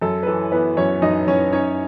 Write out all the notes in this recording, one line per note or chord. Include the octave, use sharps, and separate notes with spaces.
F#2 A4
B4
E3 A4
E3 B3 B4
F#2 C#4 C#5
F#2 D#4 D#5
F#2 C#4 C#5
C#4 D#4 C#5